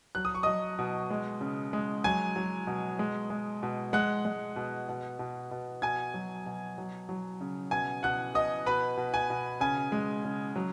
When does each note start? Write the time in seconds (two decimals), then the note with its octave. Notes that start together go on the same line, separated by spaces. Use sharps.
0.15 F#3 F#6
0.25 D#6
0.35 C#6
0.43 F#3 D#5 D#6
0.79 B2
1.10 G#3
1.41 C#3
1.73 G#3
2.04 F#3 G#5 G#6
2.36 F#3
2.67 B2
2.99 G#3
3.30 G#3
3.63 B2
3.93 G#3 F#5 F#6
4.25 G#3
4.56 B2
4.89 B2
5.19 B2
5.51 B2
5.82 B2 G#5 G#6
6.14 F#3
6.46 B2
6.78 F#3
7.09 F#3
7.41 C#3
7.71 B2 G#5 G#6
8.03 B2 F#5 F#6
8.34 B2 D#5 D#6
8.66 B2 B4 B5
8.97 B2
9.14 G#5
9.30 B2
9.61 C#3 G#5
9.92 G#3
10.25 C#3
10.56 F#3